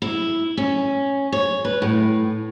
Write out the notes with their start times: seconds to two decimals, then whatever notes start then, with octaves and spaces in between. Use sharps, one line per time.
0.02 E4
0.57 C#4
1.32 C#5
1.65 B4
1.82 A2